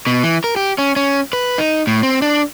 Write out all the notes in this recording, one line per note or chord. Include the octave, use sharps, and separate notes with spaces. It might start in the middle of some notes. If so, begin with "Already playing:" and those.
B2
E3
A#4
G4
C#4
C#4
B4
D#4
A2
C4
D4